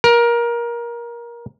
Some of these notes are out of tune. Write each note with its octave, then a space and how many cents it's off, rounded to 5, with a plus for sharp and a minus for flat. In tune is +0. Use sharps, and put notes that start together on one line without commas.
A#4 +20